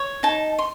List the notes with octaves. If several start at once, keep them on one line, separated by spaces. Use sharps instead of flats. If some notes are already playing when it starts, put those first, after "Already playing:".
Already playing: C#5
D#4 A5
C6